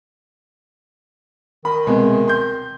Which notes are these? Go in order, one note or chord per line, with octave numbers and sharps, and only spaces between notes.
D#3 B5
C2 B2 G#3
C6 G6